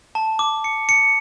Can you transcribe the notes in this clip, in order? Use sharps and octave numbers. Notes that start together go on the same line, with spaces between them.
A5
D6
C#7
C#7